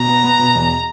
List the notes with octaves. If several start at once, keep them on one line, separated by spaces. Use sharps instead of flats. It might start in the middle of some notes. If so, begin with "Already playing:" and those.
Already playing: B2 A#5
B3
B3
B2
E2